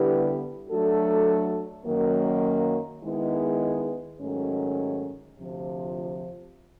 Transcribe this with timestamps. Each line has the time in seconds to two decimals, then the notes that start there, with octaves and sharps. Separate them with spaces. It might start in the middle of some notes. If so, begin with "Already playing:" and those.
Already playing: D3 G3 B3 E4 G4
0.69 F#3 A3 D4 F#4 A4
1.86 F#2 D#3 F#3 A#3
3.03 D#3 G#3 B3 E4 G#4
4.20 G#2 D#3 F#3 A3 C#4
5.37 D2 C3 F3